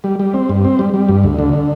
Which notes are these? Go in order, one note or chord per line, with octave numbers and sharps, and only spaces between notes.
G3
G3
C4
G2
C4
G3
G3
G2
D2
D3
D3